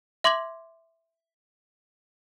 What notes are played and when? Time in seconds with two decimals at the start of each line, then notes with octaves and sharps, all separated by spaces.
0.24 E5 C6 D6 G#6 F#7